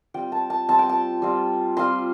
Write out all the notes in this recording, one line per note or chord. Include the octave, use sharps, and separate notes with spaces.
G3 C4 F4 G5
A5
A5
G3 C4 F4 A5
G5
A5
G3 C4 F4
G3 C4 F4 C6